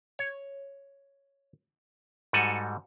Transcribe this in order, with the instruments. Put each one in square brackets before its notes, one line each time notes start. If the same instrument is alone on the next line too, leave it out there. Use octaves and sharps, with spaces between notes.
[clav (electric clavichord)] C#5
G#2 G3 F#4 A4 F#5 G#5